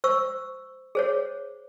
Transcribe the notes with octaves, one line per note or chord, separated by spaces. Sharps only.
C5 C#6 E6
G#4 C5 C#5